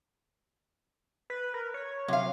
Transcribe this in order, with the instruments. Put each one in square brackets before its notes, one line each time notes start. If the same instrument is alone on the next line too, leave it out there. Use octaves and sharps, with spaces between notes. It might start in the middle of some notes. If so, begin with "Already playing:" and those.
[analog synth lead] B4
A#4
C#5
[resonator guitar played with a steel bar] C3 F5 [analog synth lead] F#3